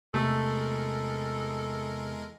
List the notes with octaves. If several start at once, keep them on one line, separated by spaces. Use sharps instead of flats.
E2 C3 G#3 A3 A4 A#4